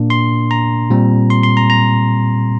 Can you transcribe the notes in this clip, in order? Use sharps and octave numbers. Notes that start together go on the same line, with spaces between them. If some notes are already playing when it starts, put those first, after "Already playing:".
Already playing: A#2 A#3 D4
C6
A#5
A#2 G3 C4
C6
C6
A#5
A#5